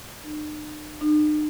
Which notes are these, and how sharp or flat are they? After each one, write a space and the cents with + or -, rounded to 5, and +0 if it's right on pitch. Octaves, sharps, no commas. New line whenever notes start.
D#4 -45
D#4 -45